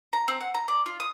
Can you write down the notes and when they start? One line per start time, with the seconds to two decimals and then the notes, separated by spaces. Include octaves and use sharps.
0.13 A#5
0.28 C4
0.41 F#5
0.54 A#5
0.68 D5
0.86 F4
1.00 D#6